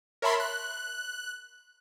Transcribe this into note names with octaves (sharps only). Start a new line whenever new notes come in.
A#4 C#5 E5 A5 B5 C6
F#6